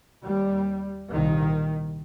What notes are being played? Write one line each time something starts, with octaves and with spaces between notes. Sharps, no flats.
D#2 G3
C2 A#2 D#3